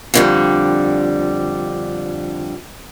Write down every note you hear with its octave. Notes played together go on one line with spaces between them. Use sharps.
F2 D3 G3